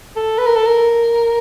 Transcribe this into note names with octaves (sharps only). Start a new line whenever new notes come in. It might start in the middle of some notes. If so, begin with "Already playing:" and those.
A4
B4
A#4
A4
A#4